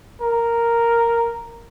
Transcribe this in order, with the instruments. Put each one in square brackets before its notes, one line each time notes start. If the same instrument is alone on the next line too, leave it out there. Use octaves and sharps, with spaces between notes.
[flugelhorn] A#4